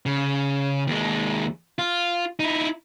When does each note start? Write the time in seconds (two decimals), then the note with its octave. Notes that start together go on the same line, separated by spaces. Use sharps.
0.06 C#3
0.87 D#2 G#3
1.79 F4
2.39 D#4 E4